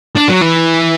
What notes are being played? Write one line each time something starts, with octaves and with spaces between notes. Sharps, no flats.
D4
F#3
E3